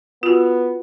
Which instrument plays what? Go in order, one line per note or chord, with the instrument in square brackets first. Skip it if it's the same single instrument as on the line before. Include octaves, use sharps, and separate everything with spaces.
[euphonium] B3 [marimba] F4 F#4